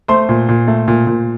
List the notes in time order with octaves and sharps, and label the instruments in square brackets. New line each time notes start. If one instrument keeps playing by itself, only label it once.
[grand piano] A3 C5 C6
A#2
A#2
A3
A#2
A#2